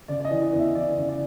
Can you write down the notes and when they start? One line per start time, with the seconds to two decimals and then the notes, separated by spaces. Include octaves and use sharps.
0.08 C#3 D5
0.20 D5
0.25 D#5
0.31 E3
0.42 D#5
0.53 E2
0.59 E5
0.75 E3 D5
0.98 C#3
1.09 D5